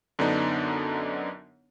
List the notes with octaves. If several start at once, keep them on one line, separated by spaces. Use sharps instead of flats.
F#2 D3 B3 D4 D#4